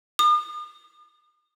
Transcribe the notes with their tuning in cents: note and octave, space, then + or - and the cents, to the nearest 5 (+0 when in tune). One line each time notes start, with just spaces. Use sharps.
D#6 -45